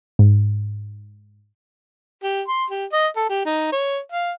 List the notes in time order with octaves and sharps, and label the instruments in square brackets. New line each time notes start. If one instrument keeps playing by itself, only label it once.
[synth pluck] G#2
[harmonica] G4
C6
G4
D#5
A4
G4
D#4
C#5
F5